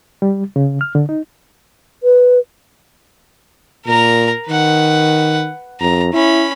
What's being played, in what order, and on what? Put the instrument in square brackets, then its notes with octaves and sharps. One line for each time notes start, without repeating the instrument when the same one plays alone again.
[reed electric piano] G3
C#3
F6
D3
D#4
[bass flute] B4
[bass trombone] A#2 [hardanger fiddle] A#4 A#5
[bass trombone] D#3 [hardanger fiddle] B4 F#5
[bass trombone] F2 [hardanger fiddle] A#5
[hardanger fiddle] C#4 B5 [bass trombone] E4